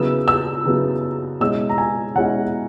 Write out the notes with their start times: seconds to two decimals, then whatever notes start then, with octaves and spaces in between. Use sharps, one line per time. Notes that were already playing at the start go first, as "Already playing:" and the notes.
Already playing: C#3 F#3 B3 E4 E6
0.28 E6
0.66 C#3 F#3 B3 E4
1.40 B2 G#3 C#4 E4 E6
1.69 A#5
1.78 G#5
2.15 B2 G#3 C#4 E4 F#5